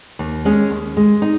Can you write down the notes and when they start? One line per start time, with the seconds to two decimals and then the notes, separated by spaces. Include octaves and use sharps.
0.19 D#2
0.45 G#3 C#4
0.71 D#2
0.97 G#3
1.22 D#4